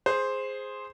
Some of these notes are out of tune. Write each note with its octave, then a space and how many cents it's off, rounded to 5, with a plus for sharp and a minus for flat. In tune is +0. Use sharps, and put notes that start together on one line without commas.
G#4 +0 C5 +0